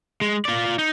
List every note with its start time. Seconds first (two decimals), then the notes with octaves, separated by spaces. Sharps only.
0.21 G#3
0.45 F4 D5
0.79 D#4